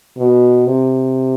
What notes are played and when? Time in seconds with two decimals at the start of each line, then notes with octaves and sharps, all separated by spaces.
0.17 B2
0.66 C3